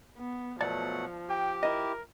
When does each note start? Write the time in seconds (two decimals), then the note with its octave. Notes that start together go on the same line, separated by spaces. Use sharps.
0.18 B3
0.61 B2 F3 F#3 A3 D5 F#5 A5
1.29 G4 G5
1.63 E4 A#4 D#5